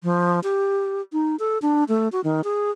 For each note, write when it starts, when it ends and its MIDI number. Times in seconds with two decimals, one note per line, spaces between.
0.04 0.40 53
0.43 1.01 67
1.13 1.36 63
1.39 1.58 69
1.62 1.84 62
1.88 2.08 57
2.12 2.21 66
2.24 2.44 51
2.44 2.71 68